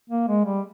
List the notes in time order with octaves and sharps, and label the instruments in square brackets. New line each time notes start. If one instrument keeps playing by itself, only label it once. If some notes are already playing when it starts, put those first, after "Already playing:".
[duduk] A#3
G#3
G3